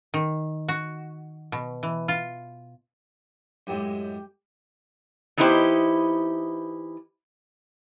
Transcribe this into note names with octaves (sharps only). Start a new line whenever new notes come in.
D#3
F#4
B2
E3
F4
F#2 A2 G#3 G4 G5 D6
E3 B3 D#4 E4 G4 C5